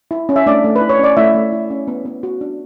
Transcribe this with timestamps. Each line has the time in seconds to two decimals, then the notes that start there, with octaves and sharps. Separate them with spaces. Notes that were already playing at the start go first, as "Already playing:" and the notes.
0.11 E4
0.29 C#4
0.36 E5
0.46 A3 D4 D5
0.64 A3
0.76 B4
0.81 E4
0.89 C#5
0.99 C#4 D5
1.17 A3 E4 E5
1.34 A3
1.52 E4
1.70 C#4
1.88 B3
2.05 B3
2.23 F#4
2.41 D4